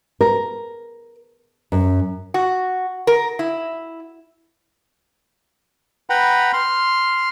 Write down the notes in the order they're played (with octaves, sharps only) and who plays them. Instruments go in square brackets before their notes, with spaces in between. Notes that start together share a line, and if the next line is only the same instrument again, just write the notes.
[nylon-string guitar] A#4
F#2
[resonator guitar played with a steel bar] F#4
A#4
E4
[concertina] B4 F#5 G5 A#5 B5
C6 F6